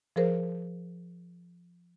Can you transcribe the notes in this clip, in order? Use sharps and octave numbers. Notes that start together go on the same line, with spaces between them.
F3 G#4 A#4 C5